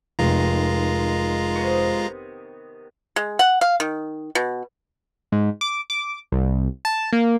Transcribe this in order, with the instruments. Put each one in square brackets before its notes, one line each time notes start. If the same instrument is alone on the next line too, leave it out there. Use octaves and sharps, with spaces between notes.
[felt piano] F1 [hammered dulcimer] D#3 [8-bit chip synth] G#3 F4 A#5
[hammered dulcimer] C3 B3 C#6
[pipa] G#3
F#5
F5
D#3
B2
[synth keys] G#2
D6
D6
C2
A5
A#3